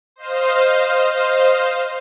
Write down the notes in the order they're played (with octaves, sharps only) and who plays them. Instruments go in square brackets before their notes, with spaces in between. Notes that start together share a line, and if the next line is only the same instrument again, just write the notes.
[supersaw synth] C5 D#5 F5